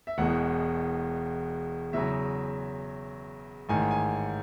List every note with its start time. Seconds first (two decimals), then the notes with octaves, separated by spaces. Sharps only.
0.07 E5
0.18 E1 E2 B2 G#3 F#5
1.93 E2 C#3 F#3 E5
3.69 A1 G#2 D#3 G#5
3.91 G#5